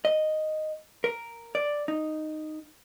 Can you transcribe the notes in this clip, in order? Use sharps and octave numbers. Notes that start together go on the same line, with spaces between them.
D#5
A#4
D5
D#4